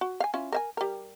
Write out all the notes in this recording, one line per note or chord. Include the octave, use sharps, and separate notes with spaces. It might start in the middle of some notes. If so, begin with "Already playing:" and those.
F#4
F5 G#5
C#4 E4 F4
A#4 E5 G#5
G3 A#4